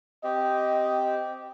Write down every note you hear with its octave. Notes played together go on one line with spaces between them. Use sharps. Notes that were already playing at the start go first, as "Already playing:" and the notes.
C4 G4 D#5